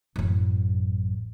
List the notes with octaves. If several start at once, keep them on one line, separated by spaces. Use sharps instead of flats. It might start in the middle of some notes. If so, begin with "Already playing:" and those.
A1 F#2